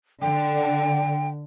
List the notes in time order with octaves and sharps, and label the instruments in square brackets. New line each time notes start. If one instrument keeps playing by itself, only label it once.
[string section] D3 [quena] G5